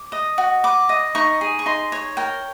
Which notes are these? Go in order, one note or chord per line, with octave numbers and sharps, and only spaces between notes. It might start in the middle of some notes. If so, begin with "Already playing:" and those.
Already playing: D6
D#5
F#4
B4 D6
D#5
D#4 C#6
G#4
C#6
D#4 C6
C#5
A#4 G5